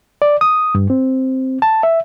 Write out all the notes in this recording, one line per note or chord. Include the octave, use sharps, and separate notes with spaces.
D5
D#6
G2
C4
A5
E5